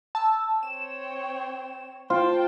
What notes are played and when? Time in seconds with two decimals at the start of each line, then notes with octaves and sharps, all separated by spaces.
0.15 A5 E6
0.63 C4 C#5 E7
2.10 F4 C5 G5 A5